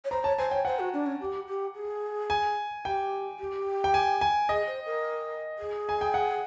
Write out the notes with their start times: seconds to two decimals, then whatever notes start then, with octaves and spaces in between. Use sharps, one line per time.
0.04 C#5
0.11 C5 A#5
0.24 C#5 A5
0.38 C5 G#5
0.51 C#5 G5
0.65 C5 F#5
0.79 F#4
0.93 D4
1.06 C#4
1.21 G4
1.47 G4
1.74 G#4
2.30 G#5
2.85 G4 G5
3.39 G4
3.84 G5
3.94 G#5
4.21 G#5
4.49 G#4 D#5
4.67 C5
4.86 A#4
5.58 G#4
5.89 G#5
6.01 G5
6.14 F#5